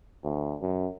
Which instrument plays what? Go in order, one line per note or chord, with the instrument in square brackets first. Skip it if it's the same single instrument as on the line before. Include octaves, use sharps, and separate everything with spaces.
[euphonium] D2
F#2